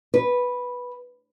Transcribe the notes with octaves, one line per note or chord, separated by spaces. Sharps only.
B4